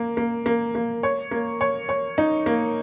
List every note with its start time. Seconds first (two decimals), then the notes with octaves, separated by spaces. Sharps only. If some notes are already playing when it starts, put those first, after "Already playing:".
Already playing: A#3
0.17 A#3
0.46 A#3
0.75 A#3
1.03 C#5
1.31 A#3
1.61 C#5
1.89 C#5
2.18 D#4
2.46 A#3